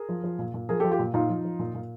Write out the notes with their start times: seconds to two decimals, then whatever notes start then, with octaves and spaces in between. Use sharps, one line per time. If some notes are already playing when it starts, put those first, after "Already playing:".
Already playing: G#4 A#4
0.09 F3
0.24 F3
0.39 A#2
0.54 A#2
0.69 F3 G#4 A#4
0.80 G4 A4
0.84 F3
0.91 F4 G4
0.99 A#2
1.14 A#2 D#4 F4
1.29 F3
1.45 F3
1.59 A#2
1.74 A#2